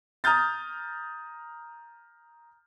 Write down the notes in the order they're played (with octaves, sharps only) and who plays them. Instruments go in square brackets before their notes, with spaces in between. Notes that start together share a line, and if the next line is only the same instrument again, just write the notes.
[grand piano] A#5 D#6 F6 G6 A6